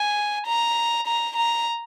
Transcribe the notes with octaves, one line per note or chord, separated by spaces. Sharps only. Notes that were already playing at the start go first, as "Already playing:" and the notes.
Already playing: G#5
A#5
A#5
A#5